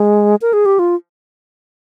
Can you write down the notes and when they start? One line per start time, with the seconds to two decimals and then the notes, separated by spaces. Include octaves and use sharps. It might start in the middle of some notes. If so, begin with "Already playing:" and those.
Already playing: G#3
0.42 A#4
0.53 G#4
0.66 G4
0.79 F4